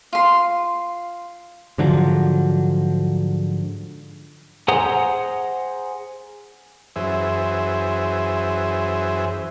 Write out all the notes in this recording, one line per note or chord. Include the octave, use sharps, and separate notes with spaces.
F4 C6
G#2 D3 F3 F#3
G#4 C5 F#5 A#5 D#6
F#2 E3 G#4 C5 E5